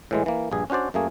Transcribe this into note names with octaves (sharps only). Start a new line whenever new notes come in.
A2 E3 G#3
E3 A#3
A#1 G2 G#4
C#4 D4 F#4 C5 D5
F#2 A3 A#3 G#4